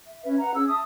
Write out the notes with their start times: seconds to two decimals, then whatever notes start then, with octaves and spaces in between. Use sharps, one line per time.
0.06 E5
0.25 C#4 B4 E5
0.39 B4 F#5 A#5
0.53 C#4 G#4 E6
0.68 E5 A5 D#6